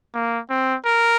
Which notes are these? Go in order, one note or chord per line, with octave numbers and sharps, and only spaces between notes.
A#3
C4
A#4